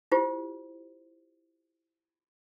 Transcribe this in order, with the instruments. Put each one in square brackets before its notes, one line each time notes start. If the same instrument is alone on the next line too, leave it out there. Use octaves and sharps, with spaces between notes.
[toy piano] E4 F4 G4 C5